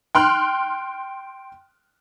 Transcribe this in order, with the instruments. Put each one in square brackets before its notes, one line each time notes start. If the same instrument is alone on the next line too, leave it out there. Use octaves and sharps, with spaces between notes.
[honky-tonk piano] G5 C6 F6 F#6